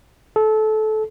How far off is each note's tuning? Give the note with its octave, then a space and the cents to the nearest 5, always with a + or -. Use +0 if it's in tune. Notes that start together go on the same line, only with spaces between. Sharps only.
A4 -20